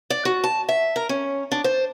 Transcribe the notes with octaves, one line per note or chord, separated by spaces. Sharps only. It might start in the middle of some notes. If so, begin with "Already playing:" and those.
D5
F#4
A5
E5
A#4
C#4
D4
C5